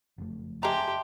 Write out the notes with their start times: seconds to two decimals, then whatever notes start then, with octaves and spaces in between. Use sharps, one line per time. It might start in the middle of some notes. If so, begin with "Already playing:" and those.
0.18 F#1 F2 A3
0.63 G#3 G4 E5 A5 A#5 C6